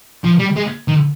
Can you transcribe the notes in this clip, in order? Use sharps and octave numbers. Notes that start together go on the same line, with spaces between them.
F3
G3
G#3
D#3